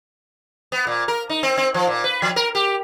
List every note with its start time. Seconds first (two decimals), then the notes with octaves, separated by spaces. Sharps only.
0.72 B3
0.87 A#2
1.08 A#4
1.29 D#4
1.43 C4
1.57 C4
1.74 F3
1.87 A#2
2.04 B4
2.22 F3
2.36 A#4
2.55 G4